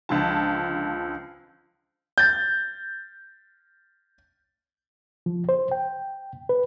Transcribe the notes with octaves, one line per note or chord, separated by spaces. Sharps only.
C#2 D3 F3 F4 A5
G6 A6
F3
C5
G5
B4